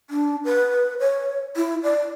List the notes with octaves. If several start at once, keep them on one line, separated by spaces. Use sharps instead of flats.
D4
B4
C#5
E4
D5